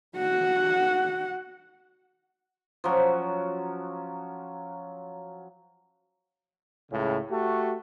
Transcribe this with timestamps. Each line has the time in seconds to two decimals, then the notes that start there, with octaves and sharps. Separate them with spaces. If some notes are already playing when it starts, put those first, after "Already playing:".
0.17 F#4 F#5
2.84 F3 F#3 C#4 F#4
6.91 C#2 A2 C#3
7.30 A3 F#4 G4